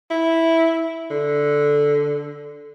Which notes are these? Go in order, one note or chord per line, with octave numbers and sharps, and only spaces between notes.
E4
D3